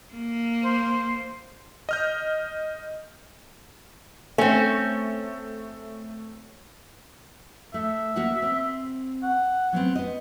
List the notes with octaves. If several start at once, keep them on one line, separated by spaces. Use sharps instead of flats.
A#3
C5
D#5 F6 G6
A3 C4 C#4
A3 E5
A#3 F#4 F#5
C4
F#5
F#3 B3 C4
B3 D#5